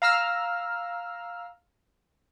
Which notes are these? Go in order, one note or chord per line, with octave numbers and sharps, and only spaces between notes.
F5 A#5 E6 F6